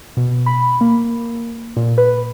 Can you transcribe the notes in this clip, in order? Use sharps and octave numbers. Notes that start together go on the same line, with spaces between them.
B2
B5
A#3
A#2
B4